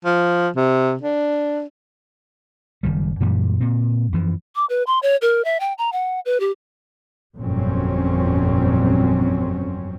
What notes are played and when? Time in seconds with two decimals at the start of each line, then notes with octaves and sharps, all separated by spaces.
0.05 F3
0.56 C3
1.01 D4
2.83 F#1 D#3 G3
3.20 F#2 A#2 E3 G3
3.61 A#2 C4
4.13 F#2 E3 F3
4.56 D6
4.70 B4
4.87 C6
5.03 C#5
5.22 A#4
5.45 E5
5.60 G5
5.78 A#5
5.93 F#5
6.25 B4
6.40 G4
7.37 G1 F2 A#2 F#3 C4 C#4